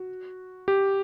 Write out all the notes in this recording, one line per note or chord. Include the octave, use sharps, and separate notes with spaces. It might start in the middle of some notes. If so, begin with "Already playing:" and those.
Already playing: F#4
G4